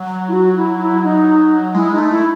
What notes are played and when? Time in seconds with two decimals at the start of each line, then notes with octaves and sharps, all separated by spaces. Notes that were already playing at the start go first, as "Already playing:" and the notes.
Already playing: F#3
0.28 E4
0.33 F#4
0.56 E4
0.80 E4
1.04 D#4
1.75 G#3 E4
1.92 D#4
1.98 A3
2.10 E4